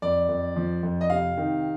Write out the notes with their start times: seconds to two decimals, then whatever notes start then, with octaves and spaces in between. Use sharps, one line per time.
0.02 F2 D5
0.29 F2
0.56 F3
0.83 F2
1.01 D#5
1.10 C3 F5
1.37 D#3